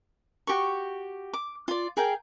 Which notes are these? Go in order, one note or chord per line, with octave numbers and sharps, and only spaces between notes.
F#4 G4 A4 C#6
D6
F4 D5
G#4 A#4 F5 G5